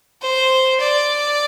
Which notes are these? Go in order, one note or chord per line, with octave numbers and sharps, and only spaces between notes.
C5
D5